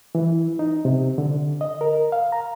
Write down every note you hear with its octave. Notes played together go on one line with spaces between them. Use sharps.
E3
D#4
C3
D3
D#5
A#4
F5
A#5